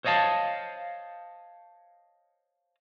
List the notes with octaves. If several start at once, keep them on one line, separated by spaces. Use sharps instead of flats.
C5 C#5 D#5 F5 A5